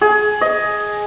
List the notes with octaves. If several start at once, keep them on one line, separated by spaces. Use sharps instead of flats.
G#4
D#5